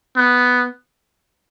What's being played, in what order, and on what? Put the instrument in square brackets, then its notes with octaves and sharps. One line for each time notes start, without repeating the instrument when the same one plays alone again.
[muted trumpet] B3